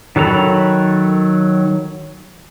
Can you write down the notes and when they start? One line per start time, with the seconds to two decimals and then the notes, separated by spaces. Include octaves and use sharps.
0.16 D#3 F#3 A4 A#5 B5